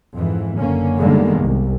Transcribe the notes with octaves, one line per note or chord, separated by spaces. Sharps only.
F2 G#2 E3
F#1 D3 A#3 C#4
D3 D#3 G3 G#3 A#3 B3
C2